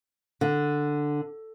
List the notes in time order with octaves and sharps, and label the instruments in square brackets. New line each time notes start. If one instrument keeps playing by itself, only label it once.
[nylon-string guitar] D3